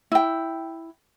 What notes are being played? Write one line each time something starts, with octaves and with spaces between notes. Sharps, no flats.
E4 G5